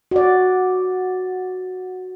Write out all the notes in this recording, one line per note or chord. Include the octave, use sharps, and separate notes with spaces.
F#4 D5